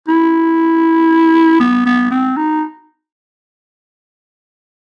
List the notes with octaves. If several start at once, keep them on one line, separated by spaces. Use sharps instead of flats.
E4
B3
B3
C4
D#4